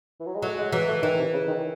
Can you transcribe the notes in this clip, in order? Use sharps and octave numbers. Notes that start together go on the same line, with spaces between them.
E3
F#3
G#3
F#3 A3
G#3
E3 F#3
A3
D#3 E3
C3
C#3
D#3